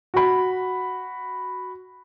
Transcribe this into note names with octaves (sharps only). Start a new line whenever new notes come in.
F#4 B5